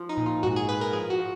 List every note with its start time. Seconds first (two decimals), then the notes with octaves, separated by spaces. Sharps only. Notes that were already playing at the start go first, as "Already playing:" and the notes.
Already playing: F3
0.09 D#4
0.17 A#2
0.26 F4
0.43 G#2 F#4
0.56 G#4
0.69 G#2 B4
0.81 A#4
0.93 F3 G#4
1.10 F#4
1.19 F3